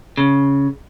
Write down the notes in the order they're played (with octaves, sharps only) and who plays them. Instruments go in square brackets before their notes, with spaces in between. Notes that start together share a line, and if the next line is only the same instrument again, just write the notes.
[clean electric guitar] C#3